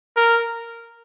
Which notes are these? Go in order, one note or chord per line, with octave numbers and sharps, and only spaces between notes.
A#4